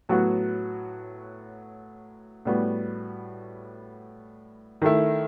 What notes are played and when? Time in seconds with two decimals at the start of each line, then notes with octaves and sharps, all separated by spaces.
0.09 A2 F#3 B3 F#4
2.45 A2 G3 B3 F#4
4.82 D#3 A3 E4